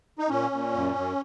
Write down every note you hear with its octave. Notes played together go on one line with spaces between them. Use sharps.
D#4
A#2 C#4
A#2
F#2
F#2